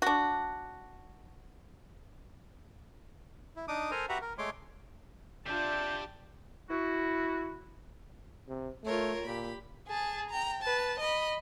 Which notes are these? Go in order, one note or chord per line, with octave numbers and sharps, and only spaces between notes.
D4 F#4
E4
D4 D#4 D6 D#6
A4 A#4 C5 G#5 A#5
F#4 G4 B4 E5 F#5 A#5
A#4
G#3 A3 C#5 C6 D6
D4 F4 G4 D5 E5 A5 G6
E4 F#4
C3
A3 F4 A#4 C#5
A#2 G4 B5
G#4 A5
G5 A#5
B4 A5
D#5 B5